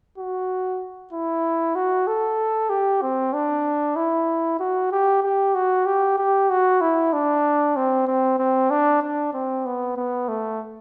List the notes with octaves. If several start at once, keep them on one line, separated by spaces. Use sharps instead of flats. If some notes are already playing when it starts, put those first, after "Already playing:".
F#4
E4
F#4
A4
G4
C4
D4
E4
F#4
G4
G4
F#4
G4
G4
F#4
E4
D4
C4
C4
C4
D4
D4
C4
B3
B3
A3